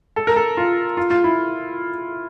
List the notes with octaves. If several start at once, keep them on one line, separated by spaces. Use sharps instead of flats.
A4
A#4
A4
F4
F4
F4
E4